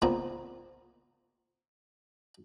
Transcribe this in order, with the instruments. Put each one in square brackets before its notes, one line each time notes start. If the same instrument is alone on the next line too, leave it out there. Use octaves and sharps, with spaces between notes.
[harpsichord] C#2 A#2 B3 C4 A#5